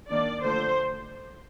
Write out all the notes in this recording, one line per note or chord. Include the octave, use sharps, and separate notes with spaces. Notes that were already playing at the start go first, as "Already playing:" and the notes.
D#3 A#3 D4 D5
D3 F3 A3 C5